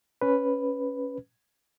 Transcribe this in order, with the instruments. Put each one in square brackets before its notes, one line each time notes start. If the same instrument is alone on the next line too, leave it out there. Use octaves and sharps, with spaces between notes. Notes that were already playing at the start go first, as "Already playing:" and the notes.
[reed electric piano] C#4 B4